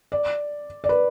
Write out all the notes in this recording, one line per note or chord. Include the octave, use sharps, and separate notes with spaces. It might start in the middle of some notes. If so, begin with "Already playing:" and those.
D5
D5
B4